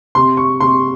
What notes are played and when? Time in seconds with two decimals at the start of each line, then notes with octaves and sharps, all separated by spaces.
0.15 C3 C6
0.37 C#6
0.60 C3 C6